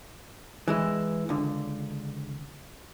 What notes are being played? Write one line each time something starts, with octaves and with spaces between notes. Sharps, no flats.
E3 G#3 E4
C#2 D3